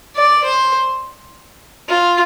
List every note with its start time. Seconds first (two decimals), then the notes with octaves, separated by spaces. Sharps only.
0.16 D5
0.44 C5
1.88 F4